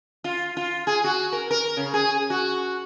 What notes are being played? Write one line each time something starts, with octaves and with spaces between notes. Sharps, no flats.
F4
F4
G#4
F#4
A#4
A#4
C#3
G#4
F#4